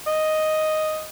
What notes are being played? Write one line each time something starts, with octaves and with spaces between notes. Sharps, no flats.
D#5